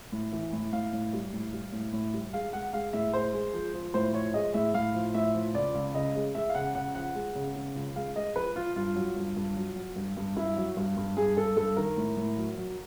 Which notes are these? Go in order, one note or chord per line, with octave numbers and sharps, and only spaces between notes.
A2
E3
A2
A2 F5
A2
G3
A2
G3
A2
A2
G3
G#3 F5
G#3 F#5
G#3 F5
A2 E5
G#3 C5
G#3
F3
F3
A2 C5
F3 C#5
G#3 D#5
A2 E5
A2 F5
F3
A2 E5
F3
C#2 D5
C#2
C#3 D#5
G#3
G#3 E5
F5
C#3 F#5
C#3 F#5
F3 F#5
G#3
C#3
C#3
C#2
G#3 F5
G#3 D#5
F3 B4
F3 F4
G2 F4
F#3
G2
G2
F#3
F#3
G2
G2
G2 E4
F#3
G2
G2
G2 G#4
G2 A4
G2 A4
D#3 A#4
A2
A2
F#3
F#3